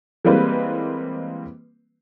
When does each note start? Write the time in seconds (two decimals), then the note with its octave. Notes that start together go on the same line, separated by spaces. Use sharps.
0.25 E3 G3 G#3 A#3 C4 B4